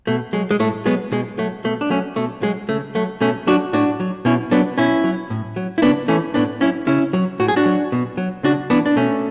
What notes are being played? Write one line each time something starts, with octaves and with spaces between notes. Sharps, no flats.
B2 A3
F#3 G#3
G#3
A2 A3
F#3 G#3 B3
B2 G#3
F#3 A3
B2 A3
D4
F#3 A3 C#4
B2 A3
F#3 G#3
C#3 A3
F#3 A3
B2 A3 C#4
F#3 D4 F#4
A2 D4 F#4
F#3
B2 C#4 E4
F#3 B3 D4
B2 C#4 E4
F#3
A2
F#3
E4
C#3 B3 D4
E3 A3 C#4
A2 B3 D4
F#3 C#4 E4
C#3 C#4 E4
F#3
A2 F#4
G#4
D4 F#4
F#3
B2
F#3
C#3 D4 F#4
E3 B3 D4
D4
B2 A3 C#4